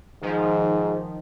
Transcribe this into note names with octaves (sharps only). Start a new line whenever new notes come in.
G#2 D#3 F3